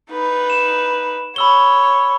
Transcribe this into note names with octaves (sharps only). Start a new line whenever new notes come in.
D#4 B4
E7
C#5 B5 E6 G7